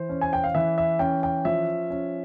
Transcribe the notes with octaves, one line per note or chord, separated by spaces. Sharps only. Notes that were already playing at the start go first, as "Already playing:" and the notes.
Already playing: E3 C5
C#4
G#5
G5
F5
E3 E5
E5
C#4 G5
G5
F3 E5
C#4